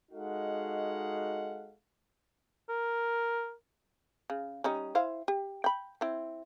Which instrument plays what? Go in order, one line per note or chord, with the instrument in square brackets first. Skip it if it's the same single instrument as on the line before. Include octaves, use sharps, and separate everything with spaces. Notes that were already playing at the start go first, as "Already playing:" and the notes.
[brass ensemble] G#3 D#4 F#4 A4 F5 F#5
[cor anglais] A#4
[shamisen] C#3
G3 C#4 D#4
E4 C5 F5
G4
G5 B5
C4 E4